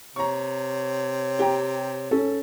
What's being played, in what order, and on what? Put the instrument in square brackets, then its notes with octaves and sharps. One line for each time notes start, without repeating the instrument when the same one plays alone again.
[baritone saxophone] C3 [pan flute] C#5 [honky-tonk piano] A#5 C#6
[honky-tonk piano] G4 G5 A#5
[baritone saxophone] G#2 [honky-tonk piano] C#4 [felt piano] A4